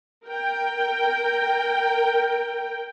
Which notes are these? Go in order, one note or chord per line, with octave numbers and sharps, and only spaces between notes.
A#4 G5